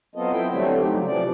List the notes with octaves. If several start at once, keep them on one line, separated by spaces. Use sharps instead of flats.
F#3 B3 C4 F4 A4 D#5
E4 G5
D3 E3 F#3 G3 A3 C4
D#4 G4
C#3 F#3
C3 E3 F3 D5